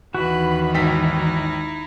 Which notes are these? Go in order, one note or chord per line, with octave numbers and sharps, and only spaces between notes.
D#2 D#3 E3 F#4 B4 B5
G#1 D#4 E4 G5 B6